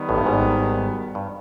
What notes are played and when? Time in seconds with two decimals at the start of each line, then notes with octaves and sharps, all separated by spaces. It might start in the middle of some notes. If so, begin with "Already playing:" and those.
Already playing: D#3 G3 B3
0.09 A1 A2
0.17 G2
0.26 G#1 G#2
1.15 G2